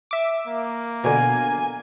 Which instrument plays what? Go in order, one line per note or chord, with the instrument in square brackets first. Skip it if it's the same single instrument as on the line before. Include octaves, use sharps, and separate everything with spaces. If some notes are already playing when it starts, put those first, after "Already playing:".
[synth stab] E5 D6
[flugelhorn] A#3
[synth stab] B2 D3 [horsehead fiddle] G#5